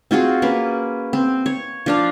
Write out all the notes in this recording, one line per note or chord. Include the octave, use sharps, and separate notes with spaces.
C4 F4 F#4 G#4
A#3 C#4 B4
C4
C#5
F3 D4 F5